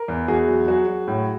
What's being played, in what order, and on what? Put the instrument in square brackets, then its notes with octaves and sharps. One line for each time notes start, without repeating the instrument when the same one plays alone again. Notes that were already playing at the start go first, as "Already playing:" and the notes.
Already playing: [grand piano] A#4
E2
E2 F#4 G#4
F#3
F#3 F#4 G#4
F#3
A2